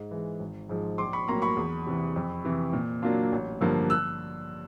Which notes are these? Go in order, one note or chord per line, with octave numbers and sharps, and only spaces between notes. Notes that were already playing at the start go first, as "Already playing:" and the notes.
Already playing: G#2
E3 G#3
G#1
G#2 F3 G#3
A#1 C6 D6
B5 C#6
A2 F#3 A#3 A#5 C6
B5 C#6
E2
C3 E3
F2
C3 E3
A#2
F#3 A#3 D4 F4
A1
G2 D3 F3 A#3
E6 F#6